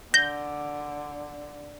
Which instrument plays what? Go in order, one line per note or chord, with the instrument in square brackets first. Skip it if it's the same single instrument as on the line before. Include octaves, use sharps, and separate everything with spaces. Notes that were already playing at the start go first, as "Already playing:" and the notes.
[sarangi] D3 [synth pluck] G6 [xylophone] A#6